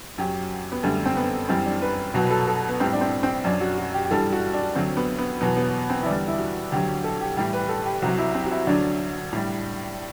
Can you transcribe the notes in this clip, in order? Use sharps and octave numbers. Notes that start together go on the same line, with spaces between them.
F#2 F#3 G4
B3
F#2 D3 G3 A3
C4
B3
F#2 E3 G3 C4
D4
B4
C2 B2 F#3 F#4
B4
A4
A4
B3
A2 G3 C4
D4
C4
C4
F#2 F#3 D4
F#4
F#4
G4
G4
G2 E3 G3 A4
F#4
D4
D2 D3 F#3 C4
B3
B3
E2 B2 F#3 B3
B3
C4
E4
E2 D3 G3 D4
E4
F#4
D2 D3 F#3 G4
A4
G4
A2 E3 G3 G4
B4
A4
G4
C2 C3 F#3 F#4
E4
C4
F#4
E4
D2 D3 F#3 D4
A2 G3